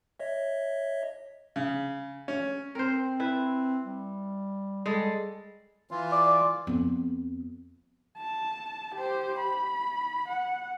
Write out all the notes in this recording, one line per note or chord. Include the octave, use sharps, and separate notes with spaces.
C#5 D#5 E5
C#3
C#4
C4 A#4 C5
E4 B4
G3
G3 G#3 A4
E3 F4
D5
F2 B3
A5
G4 C5
B5
F#5